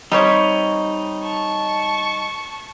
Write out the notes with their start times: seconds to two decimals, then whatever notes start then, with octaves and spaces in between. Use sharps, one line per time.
0.12 G3 C4 D#4 C#5
1.23 A5 C#6